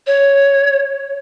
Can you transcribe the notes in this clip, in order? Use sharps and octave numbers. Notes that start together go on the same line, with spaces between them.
C#5